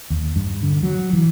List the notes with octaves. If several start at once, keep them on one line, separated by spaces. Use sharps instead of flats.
D#2
G2
D3
F#3
E3